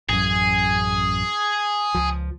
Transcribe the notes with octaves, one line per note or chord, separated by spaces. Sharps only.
A1 F#2 G#4
C#2 F3